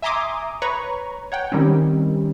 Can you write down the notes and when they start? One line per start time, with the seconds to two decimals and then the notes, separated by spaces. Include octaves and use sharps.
0.02 E5 G#5 A#5 C6 D6 D#6
0.62 B4 C#5 A#5 C#6
1.32 C#5 F#5 G5
1.52 D#3 G3 C4 C#4